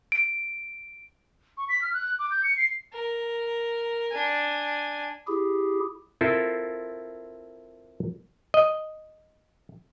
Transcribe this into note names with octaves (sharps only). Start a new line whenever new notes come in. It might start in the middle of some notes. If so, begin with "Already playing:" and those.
D7
C#6
B6
F6
F#6
D6
G6
C#7
C7
A#4
D4 G#5
E4 G4 G#4
C4 E4 F4 A4 A#4 C5
D#5